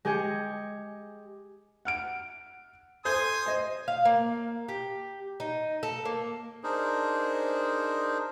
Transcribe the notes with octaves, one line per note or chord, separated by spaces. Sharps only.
G#3 G4 G#4 G#5 C#7
F#5 F6 D7
A4 C5 G#5 C6 D#6 G6
C5 D#5
F5
A#3
G4
D#4
A4
A#3
D4 D#4 G#4 A#4 C5